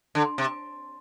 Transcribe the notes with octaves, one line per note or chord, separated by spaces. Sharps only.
D3
C3